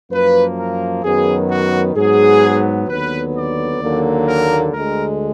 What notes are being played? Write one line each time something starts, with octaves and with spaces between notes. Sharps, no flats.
F#2 F3 A#3 B4
A#4
F#2 D#3 F#3 B3 G#4
F#4
G#2 F#3 B3 G#4
D#2 D3 F#3 B3 B4
D5
D#2 D3 F#3 A#3
A#4
D2 D3 G#3 A#4